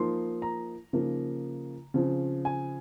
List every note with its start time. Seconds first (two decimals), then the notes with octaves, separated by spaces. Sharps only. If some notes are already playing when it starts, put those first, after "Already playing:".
Already playing: F3 A#3 D#4 C6
0.42 A#5
0.93 C#3 F3 A#3 D#4
1.94 C#3 F3 C4
2.45 G#5